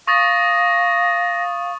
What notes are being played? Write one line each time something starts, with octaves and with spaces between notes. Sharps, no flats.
F5 C#6 D#6 A6 A#6